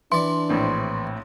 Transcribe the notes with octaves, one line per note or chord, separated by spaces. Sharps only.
E3 D4 D5 C6
A#1 A2 C4